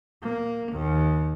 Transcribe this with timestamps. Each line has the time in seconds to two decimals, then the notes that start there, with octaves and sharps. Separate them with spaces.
0.23 A#3
0.72 D#2